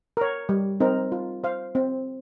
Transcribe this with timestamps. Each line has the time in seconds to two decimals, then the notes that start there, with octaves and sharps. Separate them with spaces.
0.17 A#4 C#5
0.49 G3
0.80 C4 D#4 A#4
1.12 F4
1.44 C5 F5
1.75 C4